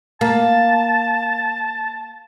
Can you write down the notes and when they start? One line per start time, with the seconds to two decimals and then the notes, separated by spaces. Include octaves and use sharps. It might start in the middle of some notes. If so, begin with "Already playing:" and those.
0.21 A#3 A5